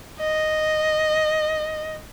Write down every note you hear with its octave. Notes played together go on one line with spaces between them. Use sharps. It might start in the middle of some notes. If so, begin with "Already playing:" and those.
D#5